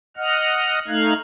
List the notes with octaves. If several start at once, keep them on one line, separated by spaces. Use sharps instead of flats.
D#5 F#5 F6
A3 D#4 F5 F#6 G#6